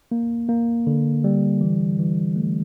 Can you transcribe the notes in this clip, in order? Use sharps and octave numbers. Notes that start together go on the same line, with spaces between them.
A#3
A#3
D3
G3
E3
E3
A3